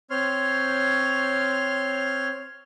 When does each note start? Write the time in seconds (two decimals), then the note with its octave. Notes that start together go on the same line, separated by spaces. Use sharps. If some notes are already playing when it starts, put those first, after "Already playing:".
0.10 C4 C#5 C6 F6